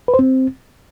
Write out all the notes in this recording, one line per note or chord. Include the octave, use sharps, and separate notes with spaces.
B4
C5
C4